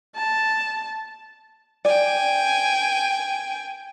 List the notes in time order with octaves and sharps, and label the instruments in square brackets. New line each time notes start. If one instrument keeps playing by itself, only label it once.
[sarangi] A5
[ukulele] D5 [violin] G5 G#5